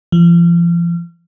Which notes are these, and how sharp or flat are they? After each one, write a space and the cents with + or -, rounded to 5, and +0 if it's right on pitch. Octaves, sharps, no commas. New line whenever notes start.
F3 -40